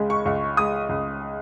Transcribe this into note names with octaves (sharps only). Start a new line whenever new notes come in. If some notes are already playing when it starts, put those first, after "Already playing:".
Already playing: C#2 G#3 B5
C#6
C#2
G#3 D#6
C#2